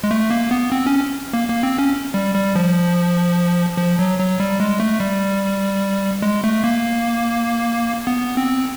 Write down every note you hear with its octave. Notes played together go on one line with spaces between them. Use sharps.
G#3
A3
A#3
B3
C4
C#4
A#3
A#3
C4
C#4
G3
G3
F3
F3
F#3
F#3
G3
G#3
A3
G3
G#3
A3
A#3
B3
C4